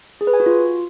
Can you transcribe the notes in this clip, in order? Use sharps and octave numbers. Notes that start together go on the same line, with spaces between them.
G#4
B4
G#5
F#4
F4